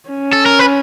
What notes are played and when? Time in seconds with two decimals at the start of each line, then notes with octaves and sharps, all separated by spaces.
0.09 C#4
0.33 A4
0.46 A#4
0.59 B4